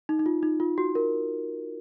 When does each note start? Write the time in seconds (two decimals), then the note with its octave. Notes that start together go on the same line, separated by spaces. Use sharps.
0.09 D#4
0.19 D#4
0.26 F4
0.43 D#4
0.60 F4
0.78 F#4
0.95 A#4